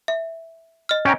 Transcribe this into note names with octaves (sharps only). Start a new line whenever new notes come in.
E5
D#5 F6
C#4 G5 A#5